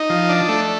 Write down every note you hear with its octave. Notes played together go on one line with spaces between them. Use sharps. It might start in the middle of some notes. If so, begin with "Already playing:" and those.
Already playing: D#4
F3
D4
A3